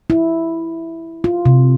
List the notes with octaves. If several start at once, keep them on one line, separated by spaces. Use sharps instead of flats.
E4
F4
C3